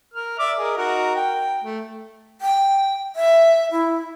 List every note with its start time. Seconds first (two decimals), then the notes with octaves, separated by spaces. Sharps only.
0.14 A#4 F6
0.39 D5 E5 D6
0.59 G#4 A#4 D#5
0.77 D#4 F#4 A#4
1.16 G5
1.64 A3
2.41 G5
3.16 E5
3.72 E4